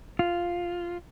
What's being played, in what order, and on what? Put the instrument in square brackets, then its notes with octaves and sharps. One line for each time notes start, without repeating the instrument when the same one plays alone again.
[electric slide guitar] F4